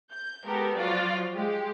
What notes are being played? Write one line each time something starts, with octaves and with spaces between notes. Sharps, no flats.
G6
G#3 B3 G4 A4 A#4
F3 F#3 F4 F#4 D5
G#3 G4